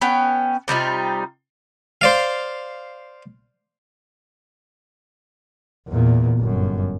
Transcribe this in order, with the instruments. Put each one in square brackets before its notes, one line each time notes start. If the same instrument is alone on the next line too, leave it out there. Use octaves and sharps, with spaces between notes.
[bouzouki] B3 C#4 G5
C3 G3 D#4 F4
[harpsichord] C5 D5 F5
[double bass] E2 A#2
G1 F#2